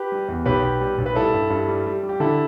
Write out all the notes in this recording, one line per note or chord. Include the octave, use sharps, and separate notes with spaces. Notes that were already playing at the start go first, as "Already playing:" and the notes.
Already playing: G4 B4
G3
E2
B1 G4 B4
B1
G3
B1
B4
G3 E4 A4
G2
G2
G3
G3
G3
G4
D3 E4 A4